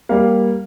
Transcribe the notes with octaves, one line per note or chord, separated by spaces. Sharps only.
G3 A#3 F5